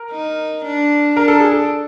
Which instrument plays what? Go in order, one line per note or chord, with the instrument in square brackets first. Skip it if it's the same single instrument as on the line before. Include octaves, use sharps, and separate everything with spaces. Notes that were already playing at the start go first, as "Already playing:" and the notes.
Already playing: [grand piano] A#4
[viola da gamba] D#4
D4
[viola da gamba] D4 [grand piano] A#4
[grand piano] A4
G#4
A4